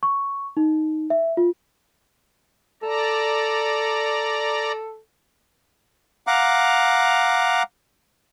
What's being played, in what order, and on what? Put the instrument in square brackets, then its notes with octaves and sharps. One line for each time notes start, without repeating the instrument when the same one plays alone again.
[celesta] C#6
D#4
E5
F4
[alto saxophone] A4 [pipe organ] D5 A#5
[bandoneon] F5 F#5 A#5 D6